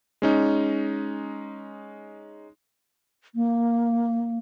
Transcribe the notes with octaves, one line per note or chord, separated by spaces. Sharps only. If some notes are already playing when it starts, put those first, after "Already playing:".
G#3 C#4 D#4
A#3